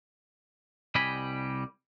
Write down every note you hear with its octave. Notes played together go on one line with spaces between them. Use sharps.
C2 G3 D#5 G#5 B5